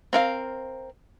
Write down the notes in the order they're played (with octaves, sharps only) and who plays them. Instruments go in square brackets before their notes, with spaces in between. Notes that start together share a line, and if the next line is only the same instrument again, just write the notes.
[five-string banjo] C4 A#4 F5